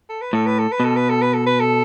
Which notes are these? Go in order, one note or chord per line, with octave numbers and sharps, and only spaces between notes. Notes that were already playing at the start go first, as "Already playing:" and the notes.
A4
B4
A2 A4
B4
A4
B4
B2 A4
B4
A4
B4
A4
B4
A4